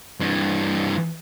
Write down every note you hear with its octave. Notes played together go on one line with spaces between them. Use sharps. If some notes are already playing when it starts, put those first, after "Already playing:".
G2 E3